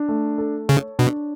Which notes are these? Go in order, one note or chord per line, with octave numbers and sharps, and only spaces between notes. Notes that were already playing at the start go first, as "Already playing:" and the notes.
Already playing: D4
A3
A4
C#3 C#5
B2 D4